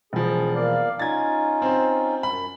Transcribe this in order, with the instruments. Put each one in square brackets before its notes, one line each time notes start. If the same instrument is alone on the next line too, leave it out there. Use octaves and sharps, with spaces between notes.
[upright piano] E1 F3 [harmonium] G#4
[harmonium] A#3 D5 F5
[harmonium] C#4 D#4 F4 [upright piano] G#6 A6
[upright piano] C4 C5
[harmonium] F#2 [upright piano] B5